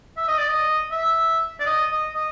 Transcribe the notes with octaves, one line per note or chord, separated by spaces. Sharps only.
E5
D#5
D5
D#5
E5
D5
D#5
D#5
D#5